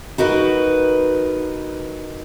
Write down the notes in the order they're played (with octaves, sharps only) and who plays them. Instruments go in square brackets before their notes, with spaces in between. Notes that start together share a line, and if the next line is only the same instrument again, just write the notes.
[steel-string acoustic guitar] D#4 F#4 A#4 B4